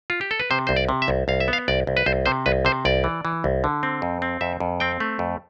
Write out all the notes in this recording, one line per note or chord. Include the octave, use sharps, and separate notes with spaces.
F4
G4
A4
B4
C3 C5
C2 C5
D5
C3
E5
C2
C2 F5
E5
B3
F5
C2 D5
C2
B4
C2 C5
C3 C5
C2 B4
C3 C5
C2 D5
E3
E3
C2
D3
C4
F2
C4
F2 E5
F2
C4 G5
A3
F2